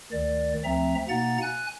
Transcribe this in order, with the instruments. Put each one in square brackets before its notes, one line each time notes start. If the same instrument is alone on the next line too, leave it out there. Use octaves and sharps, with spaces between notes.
[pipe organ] D2 D#3 D5
D2 F3 C4 E5 A#5
B2 A#3 D#4 F#5 A#5 A6
G#5 F#6